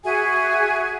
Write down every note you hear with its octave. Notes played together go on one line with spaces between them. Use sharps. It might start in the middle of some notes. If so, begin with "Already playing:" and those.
F#4 G#4 E5 G#5